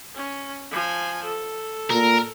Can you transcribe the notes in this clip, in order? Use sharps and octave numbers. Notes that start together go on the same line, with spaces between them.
C#4
F3 G#5
A4
A#2 A#4